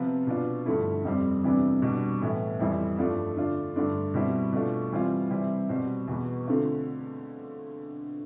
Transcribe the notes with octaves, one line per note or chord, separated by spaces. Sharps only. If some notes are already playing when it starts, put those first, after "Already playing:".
Already playing: C3 F3 B3 F4
B2 B3 D4 F4
G2 D3 F3 A3 E4
F2 C3 G3 C4
C3 E3 G3 B3 D4
B2 G3 D4
A2 E3 B3 E4
F2 E3 G3 C4 E4
G2 F3 A3 D4 F4
D3 A3 D4 F4
G2 D3 A3 D4
B2 G3 C4 E4
B2 A3 D4 F4
E3 G3 C4 F4
C3 E3 G3 C4 E4
B2 G3 C4
E2 B2 B3
D3 A3 C4 F4